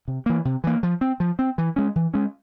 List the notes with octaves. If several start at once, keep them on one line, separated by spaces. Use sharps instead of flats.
C3
E3 A#3
C3
E3 A#3
F3
C4
F3
C4
E3
G#3 C#4
E3
G#3 C#4